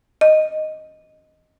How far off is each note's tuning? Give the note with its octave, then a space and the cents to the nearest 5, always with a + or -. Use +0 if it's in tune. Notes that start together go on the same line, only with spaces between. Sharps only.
D#5 +0